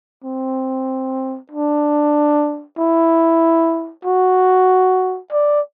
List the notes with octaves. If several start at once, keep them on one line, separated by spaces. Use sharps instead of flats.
C4
D4
E4
F#4
D5